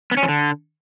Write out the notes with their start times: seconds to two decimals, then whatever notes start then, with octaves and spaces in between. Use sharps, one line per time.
0.11 B3
0.17 C#4
0.23 F3
0.28 D3